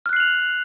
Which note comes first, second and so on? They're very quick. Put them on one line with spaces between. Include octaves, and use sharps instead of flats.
F6 F#6 C7 F#7 F7